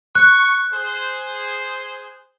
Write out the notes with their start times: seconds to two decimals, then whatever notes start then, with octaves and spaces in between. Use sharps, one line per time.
0.15 C#6 F#6
0.73 G#4 C5